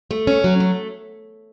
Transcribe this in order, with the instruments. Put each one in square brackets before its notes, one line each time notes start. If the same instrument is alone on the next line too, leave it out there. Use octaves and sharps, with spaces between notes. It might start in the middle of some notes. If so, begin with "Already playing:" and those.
[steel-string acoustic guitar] A3
C#4
F#3
A3